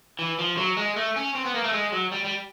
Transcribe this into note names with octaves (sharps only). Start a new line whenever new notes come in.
E3
F3
F#3
G#3
A3
C#4
C4
B3
A#3
A3
G#3
F#3
G3
G3